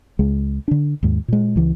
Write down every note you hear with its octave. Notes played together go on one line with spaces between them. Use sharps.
C#2 G#3
D3 D4
D#2 G#2
A#2 G#3
C#2 E3